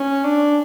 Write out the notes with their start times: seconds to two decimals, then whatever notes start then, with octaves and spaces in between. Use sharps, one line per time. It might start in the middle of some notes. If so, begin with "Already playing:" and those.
Already playing: C#4
0.25 D4